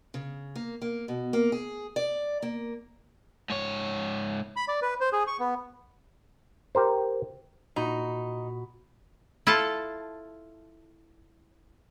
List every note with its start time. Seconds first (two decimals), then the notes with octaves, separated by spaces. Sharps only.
0.14 C#3
0.56 A#3
0.82 A#3
1.08 B2
1.33 A#3
1.52 G#4
1.96 D5
2.42 A#3
3.50 G#2 C#5
4.56 B5
4.68 D5
4.82 B4
5.01 C5
5.13 G#4
5.27 C#6
5.40 B3
6.75 G4 A#4 C5
7.76 A#2 D#4 F#4 B5
9.47 E4 F4 A4 A5